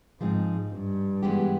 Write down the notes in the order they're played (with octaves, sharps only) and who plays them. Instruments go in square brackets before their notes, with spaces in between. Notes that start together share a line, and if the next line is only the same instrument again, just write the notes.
[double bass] G#2 [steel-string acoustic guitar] F3 G#3 C4 D#4
[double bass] G2
[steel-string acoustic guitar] E3 G#3 B3 D4 G4